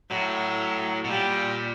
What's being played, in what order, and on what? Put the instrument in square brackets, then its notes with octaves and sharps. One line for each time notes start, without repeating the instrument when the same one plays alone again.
[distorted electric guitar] A2 [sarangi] F#3
[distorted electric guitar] B2
[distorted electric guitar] A#2 [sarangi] G3